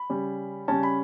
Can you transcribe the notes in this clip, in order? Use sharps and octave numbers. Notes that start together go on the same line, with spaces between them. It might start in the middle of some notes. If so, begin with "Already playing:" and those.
Already playing: B5
C#3 G3 C#4
C#3 G3 C#4 A5
B5